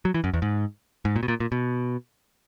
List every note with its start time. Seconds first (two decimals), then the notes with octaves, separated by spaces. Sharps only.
0.05 F#3
0.14 E3
0.24 F#2
0.33 E2
0.42 G#2
1.05 G#2
1.16 A#2
1.23 B2
1.28 A#2
1.40 A#2
1.52 B2